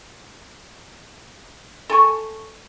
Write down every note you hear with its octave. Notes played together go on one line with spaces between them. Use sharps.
A4 G#5 C#6